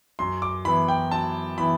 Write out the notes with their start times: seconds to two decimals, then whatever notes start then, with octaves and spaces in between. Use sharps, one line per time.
0.19 F#2 C6
0.42 D6
0.65 E3 B3 E4 B5
0.88 G5
1.11 F#2 A5
1.58 E3 B3 E4 B5